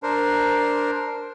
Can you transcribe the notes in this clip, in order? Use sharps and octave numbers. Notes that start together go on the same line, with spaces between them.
D4 A#4 C5